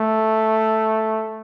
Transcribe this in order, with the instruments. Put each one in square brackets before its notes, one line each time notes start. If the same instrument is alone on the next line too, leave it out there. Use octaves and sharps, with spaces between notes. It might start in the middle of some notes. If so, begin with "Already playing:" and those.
Already playing: [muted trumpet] A3